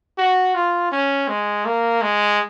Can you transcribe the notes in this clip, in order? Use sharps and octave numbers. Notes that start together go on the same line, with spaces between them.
F#4
F4
C#4
G#3
A#3
G#3